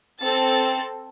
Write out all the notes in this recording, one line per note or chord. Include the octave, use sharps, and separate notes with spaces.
C4 A4 A6